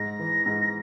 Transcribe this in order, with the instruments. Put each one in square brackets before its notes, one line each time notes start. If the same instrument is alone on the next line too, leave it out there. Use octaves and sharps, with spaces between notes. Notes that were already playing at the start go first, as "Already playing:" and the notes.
Already playing: [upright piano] G#2 [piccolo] A#6
[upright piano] E3
G#2